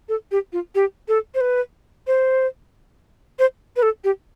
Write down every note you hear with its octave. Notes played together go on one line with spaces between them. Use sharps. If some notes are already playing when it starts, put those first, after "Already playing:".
A4
G4
F4
G4
A4
C5
B4
C5
C5
B4
A4
G4